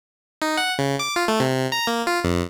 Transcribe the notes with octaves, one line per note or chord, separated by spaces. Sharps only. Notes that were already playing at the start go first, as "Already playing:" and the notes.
D#4
F#5
C#3
D6
F4
A3
C3
A#5
A#3
F4
F2